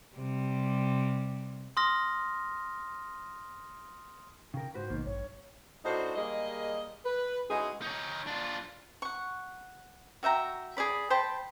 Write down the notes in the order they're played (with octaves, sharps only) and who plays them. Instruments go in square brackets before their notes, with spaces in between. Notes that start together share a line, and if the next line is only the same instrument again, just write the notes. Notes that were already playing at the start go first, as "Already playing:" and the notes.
[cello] C3 G3
[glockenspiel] C6 D#6 F6 A#6
[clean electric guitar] C#3 A#4 [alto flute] G5
[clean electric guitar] G#2 F#4 B4 [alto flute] C5
[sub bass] A#1 [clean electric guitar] B2 D#3 A#3
[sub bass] A1 [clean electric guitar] G2 [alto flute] C#5
[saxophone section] A2 D4 D#4 F#4 C5
G3 G#3 A#3 G#4 D#5
B4
G#3 C#4 D#4 E4 F#4 G#4
[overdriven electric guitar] D#4 C#5
D4 F4
[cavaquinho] F#5 C#6
F#4 E5 G5 A#5
G#4 A4 D5 B5
C5 G5 A5 B5